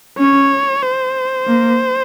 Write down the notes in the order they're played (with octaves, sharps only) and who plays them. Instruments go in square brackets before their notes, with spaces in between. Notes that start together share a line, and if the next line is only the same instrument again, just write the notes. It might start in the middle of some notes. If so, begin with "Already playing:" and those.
[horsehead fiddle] C#4 [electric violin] C#5
[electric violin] C5
[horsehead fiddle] A#3